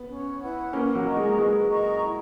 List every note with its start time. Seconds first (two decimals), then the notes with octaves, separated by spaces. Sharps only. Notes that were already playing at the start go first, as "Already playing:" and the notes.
Already playing: B3
0.08 C#4
0.41 E4 B4 F#5
0.73 A#3 C#4 B4
0.95 F#3 A#3
1.05 D#5 A#5 C#6
1.17 G#3
1.38 G#3 B4
1.70 D#5 A#5 C#6
2.03 E4